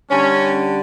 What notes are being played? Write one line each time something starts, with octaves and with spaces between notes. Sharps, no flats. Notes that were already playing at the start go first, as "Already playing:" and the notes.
D3 G3 C#4